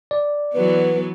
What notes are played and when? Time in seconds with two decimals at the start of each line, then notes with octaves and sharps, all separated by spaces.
0.11 D5
0.54 E3 F#3 B3 B4